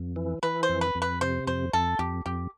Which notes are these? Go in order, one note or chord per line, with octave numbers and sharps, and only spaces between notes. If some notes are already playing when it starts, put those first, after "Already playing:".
Already playing: F2
E3
E3 B4
C5
F2
B4
F2
B4
C3 C5
F2 C5
F2 A4
F2 G4
F2 G4